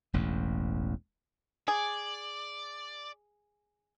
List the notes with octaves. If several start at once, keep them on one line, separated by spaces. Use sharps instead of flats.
E1 A1 E2
G#4 D5